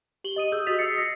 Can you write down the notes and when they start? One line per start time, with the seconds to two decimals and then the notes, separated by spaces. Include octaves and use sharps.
0.24 G4 F#7 G7
0.36 D#5 D#6 D#7
0.52 G#4 D#6 E6 G6
0.67 F#4 D#5 G6 A6 B6 F7
0.79 D#6 E6 A6 C7 C#7
0.97 A#6 C7